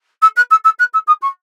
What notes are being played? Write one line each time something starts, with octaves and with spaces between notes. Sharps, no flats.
E6
F#6
E6
E6
F#6
E6
D#6
C#6